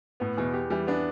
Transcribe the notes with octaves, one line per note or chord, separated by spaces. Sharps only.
A2 B3
E2 B2
G4
E3 G3
B3 D4